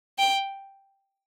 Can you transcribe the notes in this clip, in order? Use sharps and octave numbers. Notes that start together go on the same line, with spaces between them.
G5